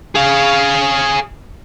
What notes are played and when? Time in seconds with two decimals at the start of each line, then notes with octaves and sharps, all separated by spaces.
0.15 G#4 F5